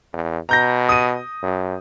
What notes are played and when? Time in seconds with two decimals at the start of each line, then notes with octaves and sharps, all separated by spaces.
0.13 E2
0.49 B2 A#5 G6 A#6
0.89 D#6 D#7
1.43 F#2